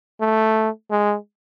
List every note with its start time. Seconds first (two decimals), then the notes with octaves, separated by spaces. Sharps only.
0.21 A3
0.91 G#3